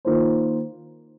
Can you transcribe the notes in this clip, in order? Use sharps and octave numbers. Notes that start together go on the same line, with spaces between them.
D#3 A#3 F4 C5